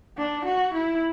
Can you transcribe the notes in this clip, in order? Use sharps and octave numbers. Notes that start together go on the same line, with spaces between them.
D4
F#4
E4